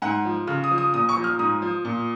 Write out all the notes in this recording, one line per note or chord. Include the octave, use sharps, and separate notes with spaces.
G#2 F#5
F3
C#3 F6
D#6
F3
D#6
A#2 D#6
C#6
F3
F6
G#2 D#6
F3
A#2